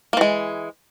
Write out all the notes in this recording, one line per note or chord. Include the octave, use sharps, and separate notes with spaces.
E3 G#3 A#3